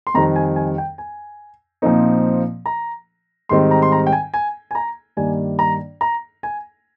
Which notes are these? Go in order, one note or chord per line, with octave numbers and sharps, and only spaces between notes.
C6
F2 D#3 G3 C4 A#5
G#5
G#5
G5
G#5
A#2 F3 C4 D#4
A#5
G#2 D#3 G3 C4 D#4 C6
A#5
C6
A#5
G5
G#5
G#5
G#5
A#5
G2 D#3 G3 A#3 D4 G#5
A#5
A#5
G#5